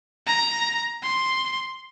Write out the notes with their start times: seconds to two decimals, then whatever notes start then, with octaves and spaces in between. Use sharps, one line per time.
0.27 A#5
1.03 C6